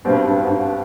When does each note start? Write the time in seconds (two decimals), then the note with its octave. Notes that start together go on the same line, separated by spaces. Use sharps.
0.05 G2 B2 G3 C4
0.28 G2
0.43 G#2
0.50 G2